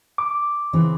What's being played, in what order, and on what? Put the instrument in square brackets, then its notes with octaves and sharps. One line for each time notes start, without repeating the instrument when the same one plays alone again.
[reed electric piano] D6
[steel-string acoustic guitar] C#3 E3 C4